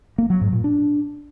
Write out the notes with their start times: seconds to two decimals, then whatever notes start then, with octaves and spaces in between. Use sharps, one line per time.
0.18 A#3
0.30 F#3
0.41 G#2
0.53 A#2
0.64 D4